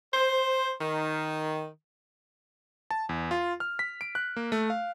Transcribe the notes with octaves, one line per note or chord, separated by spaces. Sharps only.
C5
D#3
A5
E2
F4
F6
B6
D7
F#6
A#3
A3
F5